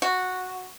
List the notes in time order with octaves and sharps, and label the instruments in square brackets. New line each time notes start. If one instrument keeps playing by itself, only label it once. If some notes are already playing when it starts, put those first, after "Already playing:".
[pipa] F#4